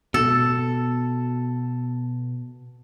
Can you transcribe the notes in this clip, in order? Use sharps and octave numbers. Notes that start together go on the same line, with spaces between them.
B2 A4